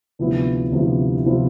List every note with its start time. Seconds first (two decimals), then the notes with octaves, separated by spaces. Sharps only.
0.19 D2 C3 F3 B3 E4
0.72 D2 C3 F3 B3 E4
1.26 C3 F3 B3 E4